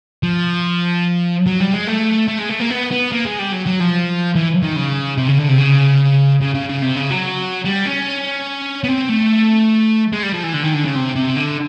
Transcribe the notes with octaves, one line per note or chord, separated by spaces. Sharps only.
F3
F#3
G3
G#3
A3
A3
G#3
A3
A#3
B3
B3
A#3
G#3
G3
F#3
F#3
F3
E3
D#3
C#3
C3
C#3
D3
C3
C#3
C#3
C#3
C#3
C3
C#3
F#3
G3
C#4
B3
C4
A3
G#3
G3
F3
E3
D3
D#3
D3
C#3
C3
C3
D3